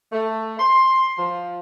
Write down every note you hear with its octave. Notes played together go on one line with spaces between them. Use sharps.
A3
C6
F3